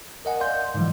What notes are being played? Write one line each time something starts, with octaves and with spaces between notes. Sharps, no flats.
A#4 D#5 F#5 G#5
D5 F5 C6 G6
G#2 D3 E3 F3 G3